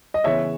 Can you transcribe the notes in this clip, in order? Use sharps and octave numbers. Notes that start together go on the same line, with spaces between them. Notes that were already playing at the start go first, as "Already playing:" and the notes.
D#5
C#3 E3 B3 C#5 E5